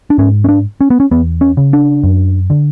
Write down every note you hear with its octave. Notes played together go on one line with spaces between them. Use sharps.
D4
G#2 C#4
C#4
D4
C#4
B3
C#4
E2 B3
C#4
C#3
D4
F#2
D3